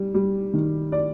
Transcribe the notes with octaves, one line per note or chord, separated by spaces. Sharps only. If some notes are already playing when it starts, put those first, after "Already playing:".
Already playing: G3
G3
D#3
D5